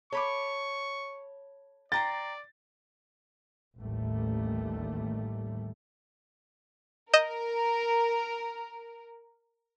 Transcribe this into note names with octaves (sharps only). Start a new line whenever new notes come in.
A4 C#5 B5 C#6 D6
D5 G5 A#5 C6 A6
A1 D#2 G3 A3
A#4 D#5 G6 E7